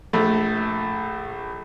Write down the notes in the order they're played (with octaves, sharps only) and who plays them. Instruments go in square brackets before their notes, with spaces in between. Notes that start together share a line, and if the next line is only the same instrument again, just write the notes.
[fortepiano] A#1 A3